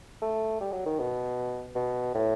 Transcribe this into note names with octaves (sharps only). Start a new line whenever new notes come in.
A3
G3
F#3
D#3
B2
B2
A2